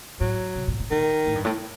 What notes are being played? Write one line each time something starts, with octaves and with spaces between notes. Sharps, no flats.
A2 F#3
C3
A#2
A2
A#2 D#3
A2
G2
A2